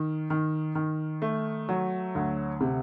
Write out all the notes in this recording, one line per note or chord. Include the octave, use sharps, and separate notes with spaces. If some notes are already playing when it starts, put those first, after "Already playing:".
Already playing: D#3
D#3
D#3
A3
F#3
D2
C3